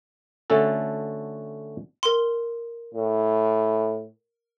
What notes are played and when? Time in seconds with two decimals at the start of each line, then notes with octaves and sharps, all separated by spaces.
0.50 D3 A3 C#4 F#4 A4
2.03 A#4 C6
2.94 A2